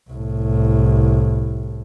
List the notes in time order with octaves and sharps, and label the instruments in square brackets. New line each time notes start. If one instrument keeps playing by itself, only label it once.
[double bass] C2 A2